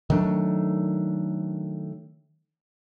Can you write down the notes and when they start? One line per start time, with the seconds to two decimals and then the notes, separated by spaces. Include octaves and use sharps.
0.10 D#3 F#3 A3 D4